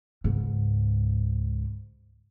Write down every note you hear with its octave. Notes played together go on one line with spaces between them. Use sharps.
C#2 G#2